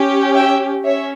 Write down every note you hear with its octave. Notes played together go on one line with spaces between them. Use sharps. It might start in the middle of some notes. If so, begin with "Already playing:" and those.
Already playing: C#4 G4
E5 G5
C#4 C#5 E5